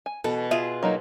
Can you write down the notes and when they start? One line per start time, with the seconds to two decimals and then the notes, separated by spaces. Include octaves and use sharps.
0.06 G#5
0.24 B2 E3 A4
0.51 F4 G#4 E5
0.83 F#3 A#3 D#4